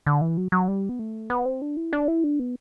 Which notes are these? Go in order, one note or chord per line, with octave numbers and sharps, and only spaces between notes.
D3
E3
F#3
F#3
G3
B3
A3
B3
C4
D4
E4
D4
E4
D4
B3